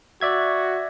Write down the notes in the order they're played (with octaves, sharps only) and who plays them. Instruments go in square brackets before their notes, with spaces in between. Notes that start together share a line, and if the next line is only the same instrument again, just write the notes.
[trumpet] F#4 [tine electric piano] D5 E5 G#6